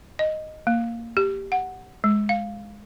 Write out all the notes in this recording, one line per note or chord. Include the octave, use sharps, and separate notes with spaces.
D#5
A#3
G4
F#5
G#3
F5